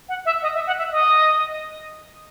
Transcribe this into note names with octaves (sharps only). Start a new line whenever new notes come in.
F#5
E5
D#5
E5
F#5
E5
D#5